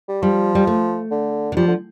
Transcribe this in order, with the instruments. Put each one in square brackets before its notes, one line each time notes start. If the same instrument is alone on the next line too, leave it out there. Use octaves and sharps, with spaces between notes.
[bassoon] G3
[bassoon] F3 [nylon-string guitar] G3
[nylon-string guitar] G3
A3
[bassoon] D3
[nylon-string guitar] D3
[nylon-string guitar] F3 [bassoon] G3
[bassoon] D3